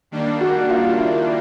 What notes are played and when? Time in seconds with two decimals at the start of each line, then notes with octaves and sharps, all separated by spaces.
0.11 D#3 G3 A#3 D4
0.41 F#4
0.70 F4
0.97 E4